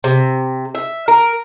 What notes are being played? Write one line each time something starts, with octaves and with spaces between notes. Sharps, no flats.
C3
E5
A#4